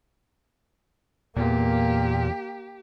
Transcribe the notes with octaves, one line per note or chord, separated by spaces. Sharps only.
E2 A#2 A#3 G4